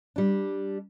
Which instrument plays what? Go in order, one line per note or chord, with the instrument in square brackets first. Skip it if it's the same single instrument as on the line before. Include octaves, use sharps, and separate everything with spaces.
[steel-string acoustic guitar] G3 D4